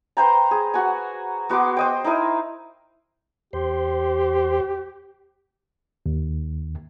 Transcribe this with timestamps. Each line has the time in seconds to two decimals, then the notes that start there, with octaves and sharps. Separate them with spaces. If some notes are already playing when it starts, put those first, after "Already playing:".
0.17 B4 C5 G5 A#5
0.51 G#4
0.74 F#4 F#5 G#5
1.49 B3 F#4 C6 D6
1.77 C5 D#5 G5
2.04 D#4 E4 A#4 D#5
3.53 E2 G4 C5 C6
6.06 D#2